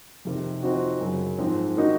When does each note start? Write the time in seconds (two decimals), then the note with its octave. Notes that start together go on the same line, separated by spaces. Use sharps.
0.25 F2 C3 D#3
0.62 F3 C4 D#4 F#4
1.01 F#2 C#3 F#3
1.38 G#2 F3 C4
1.77 D#3 A#3 D#4 F#4